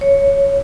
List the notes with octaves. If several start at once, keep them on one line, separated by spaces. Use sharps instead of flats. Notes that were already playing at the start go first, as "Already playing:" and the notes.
C#5